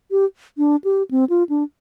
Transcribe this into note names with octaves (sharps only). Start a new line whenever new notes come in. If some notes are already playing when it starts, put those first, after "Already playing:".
G4
D4
G4
C4
F4
D4